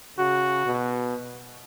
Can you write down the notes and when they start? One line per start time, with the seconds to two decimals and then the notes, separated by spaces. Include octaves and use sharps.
0.18 C#3 F#4
0.66 B2